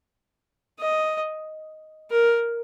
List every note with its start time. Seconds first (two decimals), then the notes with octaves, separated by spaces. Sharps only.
0.79 D#5
2.11 A#4